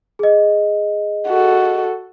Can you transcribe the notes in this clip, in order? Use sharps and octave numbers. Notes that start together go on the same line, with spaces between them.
G#4 D#5
F#4 A4